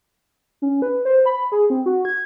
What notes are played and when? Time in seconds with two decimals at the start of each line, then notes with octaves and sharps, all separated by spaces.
0.62 C#4
0.82 B4
1.05 C5
1.26 B5
1.52 G#4
1.70 C4
1.86 F#4
2.05 G#6